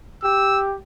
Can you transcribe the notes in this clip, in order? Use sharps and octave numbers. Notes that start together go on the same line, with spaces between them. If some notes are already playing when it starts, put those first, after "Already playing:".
G4 E6